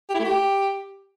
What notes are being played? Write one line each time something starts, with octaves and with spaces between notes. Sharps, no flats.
G4
E4
A3
G4